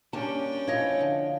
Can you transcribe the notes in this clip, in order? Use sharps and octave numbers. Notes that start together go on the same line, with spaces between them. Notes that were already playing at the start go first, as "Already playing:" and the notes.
G3 A#3 C#4 D4 G5 A5
F3 E4 C#5 D#5 F5
D3